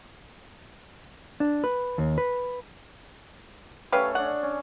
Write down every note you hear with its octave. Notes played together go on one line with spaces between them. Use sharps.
D4
B4
D#2
B4
A3 C#4 G4 B4 C#5 F5
D4 G#4 A4 F#5
C#4